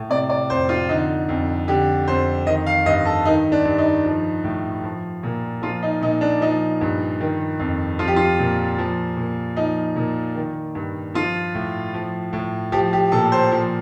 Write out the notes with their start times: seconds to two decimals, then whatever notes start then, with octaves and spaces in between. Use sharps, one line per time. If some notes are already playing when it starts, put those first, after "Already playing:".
Already playing: A2
0.09 C3 D5
0.30 D5
0.50 F2 C5
0.69 F4
0.89 D3 D#4
1.29 F2
1.68 D3 G4
2.08 F2 C5
2.47 D#3 D#5
2.66 F5
2.86 G2 D#5
3.05 A4
3.25 D#3 D#4
3.52 D4
3.65 G2
3.78 D#4
4.05 F3
4.44 A2
4.84 F3
5.23 A#2
5.62 F3 F4
5.83 D#4
6.01 A#2 D#4
6.21 D4
6.41 F3 D#4
6.81 G2
7.21 D#3
7.59 F2
7.99 F3 F4
8.08 G4
8.16 F4
8.39 A#2
8.79 F3
9.17 A#2
9.56 F3 D#4
9.96 A#2
10.35 D#3
10.75 G2
11.14 F3 F4
11.55 A2
11.94 F3
12.33 A2
12.72 F3 G4
12.93 G4
13.12 A#2 A4
13.32 C5
13.51 F3